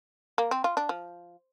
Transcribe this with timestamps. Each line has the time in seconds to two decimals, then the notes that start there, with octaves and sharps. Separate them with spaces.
0.38 A#3
0.51 C4
0.64 F4
0.77 D4
0.89 F3